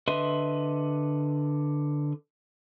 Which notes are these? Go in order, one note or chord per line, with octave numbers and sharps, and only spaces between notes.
D3 B4 D#5 E5 C6